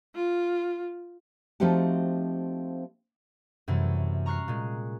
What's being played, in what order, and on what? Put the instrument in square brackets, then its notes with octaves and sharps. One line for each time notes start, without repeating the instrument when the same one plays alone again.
[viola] F4
[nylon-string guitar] F3 A3 C4 D#4 F#4 G4
[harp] F#2 C3 E3 G3 A3
A#5 C#6 F6 F#6 C7
A#2 G#3